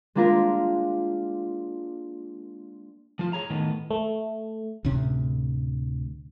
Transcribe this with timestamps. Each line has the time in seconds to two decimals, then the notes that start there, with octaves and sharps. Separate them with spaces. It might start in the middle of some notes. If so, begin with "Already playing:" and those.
0.15 G#3 A#3 D4 F4 A#4
3.19 F3 F4
3.33 G#4 C#5 A#5
3.50 A2 D#3 B3
3.91 A3
4.85 D2 A2 C3 C#4